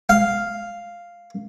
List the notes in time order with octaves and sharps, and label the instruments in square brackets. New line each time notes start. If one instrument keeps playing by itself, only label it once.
[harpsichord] F5